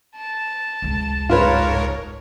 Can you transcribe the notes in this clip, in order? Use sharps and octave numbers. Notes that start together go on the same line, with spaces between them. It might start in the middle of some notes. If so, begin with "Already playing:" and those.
A5
F1 C#2
G#2 F4 A#4 B4 C#5